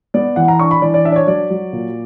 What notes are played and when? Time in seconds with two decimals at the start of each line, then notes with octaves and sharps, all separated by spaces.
0.14 B3 D5
0.36 E3 F#5
0.48 A#5
0.59 D4 C#6
0.71 B5
0.82 E3 D5
0.94 D5
1.04 D4 E5
1.12 D5
1.16 C#5
1.27 F#3 D5
1.50 F#3
1.73 A#2